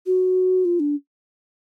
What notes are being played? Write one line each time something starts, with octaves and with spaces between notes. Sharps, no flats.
F#4
F4
D4